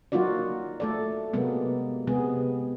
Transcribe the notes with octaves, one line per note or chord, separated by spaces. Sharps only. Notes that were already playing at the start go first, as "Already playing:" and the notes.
F#3 A#3 D#4 F4 F#4 D5
A3 A4 D5
C3 F#3 G#3 A#3 B3
C3 G#3 B3 G#4